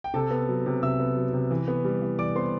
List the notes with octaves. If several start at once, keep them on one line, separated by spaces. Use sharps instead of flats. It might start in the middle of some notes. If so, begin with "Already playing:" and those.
G5
C3 A4 A5
B3
F#3
C3
C3 E5 E6
B3
F#3
C3
E3
B3
G3
E3
E3 D5 D6
B3 C5 C6